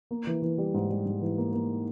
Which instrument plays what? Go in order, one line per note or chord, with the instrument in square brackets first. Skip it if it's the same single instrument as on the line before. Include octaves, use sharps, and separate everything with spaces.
[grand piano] A#3
E3
E3
G3
G#2
G3
G#2
E3
A#3
A#3